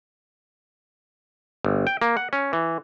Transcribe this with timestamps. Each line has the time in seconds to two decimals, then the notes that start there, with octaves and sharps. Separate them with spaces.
1.65 G1
1.87 G5
2.02 A#3
2.17 F#5
2.33 C#4
2.53 E3